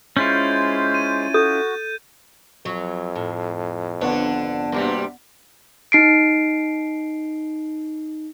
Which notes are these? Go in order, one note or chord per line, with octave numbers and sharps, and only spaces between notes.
G#3 C#4 E4 F4 C5 G6 A6
D#7
F#4 A4 G6
F2 F#3
A2
G#1 D3 B3 D4 B4 C#5 F#5
G2 C3 G3 A#3 D4 F#4
D#4 C7 D7